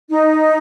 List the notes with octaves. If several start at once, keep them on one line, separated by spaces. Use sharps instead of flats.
D#4